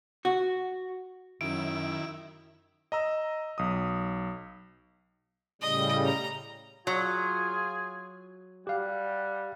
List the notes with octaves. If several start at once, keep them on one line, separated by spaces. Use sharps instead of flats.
F#4
F#2 D#3 E4 D7
D#5 A#5 E6
B1 D#6
A2 C#3 G3 D#5
A#5
F#3 F4 G#4
G3 G4 F5 F#5